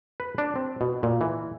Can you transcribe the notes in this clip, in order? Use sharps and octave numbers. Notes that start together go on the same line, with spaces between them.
B4
D4
C4
B2
A#2
E3